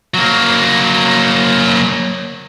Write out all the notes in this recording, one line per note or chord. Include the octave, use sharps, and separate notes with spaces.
F#3 A#3